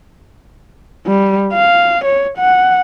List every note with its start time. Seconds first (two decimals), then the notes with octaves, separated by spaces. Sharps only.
1.07 G3
1.53 F5
2.05 C#5
2.38 F#5